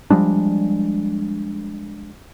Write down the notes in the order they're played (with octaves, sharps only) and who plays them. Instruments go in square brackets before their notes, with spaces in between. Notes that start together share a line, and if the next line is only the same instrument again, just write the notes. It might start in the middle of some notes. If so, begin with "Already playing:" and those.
[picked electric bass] F3 G3 G#3 D4